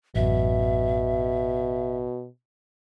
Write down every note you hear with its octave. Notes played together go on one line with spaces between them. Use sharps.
A1 F#2 B2 E5